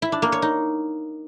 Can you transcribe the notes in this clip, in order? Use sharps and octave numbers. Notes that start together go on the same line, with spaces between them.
E4
D4
A#3
C#5
D#4